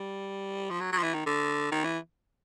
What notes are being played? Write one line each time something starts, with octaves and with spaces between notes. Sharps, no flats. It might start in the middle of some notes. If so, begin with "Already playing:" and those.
Already playing: G3
F3
F#3
F#3
F3
E3
D#3
D3
D#3
E3